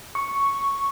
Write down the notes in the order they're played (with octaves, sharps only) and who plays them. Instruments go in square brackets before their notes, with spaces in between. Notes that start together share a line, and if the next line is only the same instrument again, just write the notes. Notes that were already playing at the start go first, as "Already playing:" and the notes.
[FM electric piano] C#6